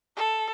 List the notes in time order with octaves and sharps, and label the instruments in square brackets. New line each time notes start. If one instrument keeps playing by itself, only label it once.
[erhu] A4